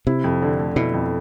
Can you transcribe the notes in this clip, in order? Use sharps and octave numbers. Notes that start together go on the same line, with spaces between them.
C3 E4
F2
D3
A3
B2 E4
F2